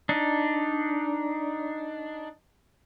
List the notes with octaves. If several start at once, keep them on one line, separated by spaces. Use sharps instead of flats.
D4 D#4